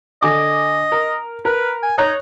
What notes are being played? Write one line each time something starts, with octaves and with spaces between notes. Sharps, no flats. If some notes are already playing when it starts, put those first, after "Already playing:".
D3 D#5 G#5 D6
A#4
A#4 B4
G#5
D#4 C#5 A#5 F#6